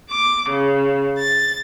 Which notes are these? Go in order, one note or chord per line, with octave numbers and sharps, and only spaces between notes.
D6
C#3
A6